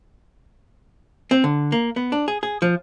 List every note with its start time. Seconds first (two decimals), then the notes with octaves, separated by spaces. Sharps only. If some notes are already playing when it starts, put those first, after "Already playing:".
1.31 C4
1.44 D3
1.72 A#3
1.96 B3
2.12 D4
2.28 G#4
2.43 G#4
2.62 F3